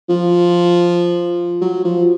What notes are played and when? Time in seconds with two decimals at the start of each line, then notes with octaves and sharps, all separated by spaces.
0.09 F3
1.61 F#3
1.84 F3